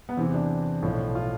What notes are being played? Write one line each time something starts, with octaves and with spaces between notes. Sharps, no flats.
B3
E2 C3 E3 C4
D4
B1 A2 F3
F4